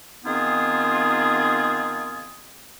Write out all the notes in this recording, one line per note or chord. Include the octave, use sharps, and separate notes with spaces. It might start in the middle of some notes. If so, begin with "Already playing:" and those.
D#3 B3 C4 D#4 F4 G#4